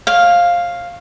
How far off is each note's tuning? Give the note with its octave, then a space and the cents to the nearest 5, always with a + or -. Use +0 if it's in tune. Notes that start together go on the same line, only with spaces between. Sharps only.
C#5 -35 F5 +0